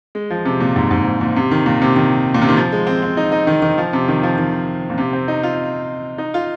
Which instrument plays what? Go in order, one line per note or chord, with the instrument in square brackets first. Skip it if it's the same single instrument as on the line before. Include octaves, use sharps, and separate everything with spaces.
[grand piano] G#3
F3
C3
A#2
G#2
G#2
A#2
A#2
C3
D#3
A#2
C3
D#3
A#2
C3
D#3
F3
G#3
C4
C4
D#4
D#4
D#3
D#3
F3
C3
D#3
F3
D#3
A#2
C3
C4
D#4
F4
D#4
F4